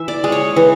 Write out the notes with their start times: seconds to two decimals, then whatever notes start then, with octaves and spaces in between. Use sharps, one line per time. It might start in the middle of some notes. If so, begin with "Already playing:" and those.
Already playing: E3 E5
0.08 D5
0.24 G#3
0.32 C#5
0.56 E3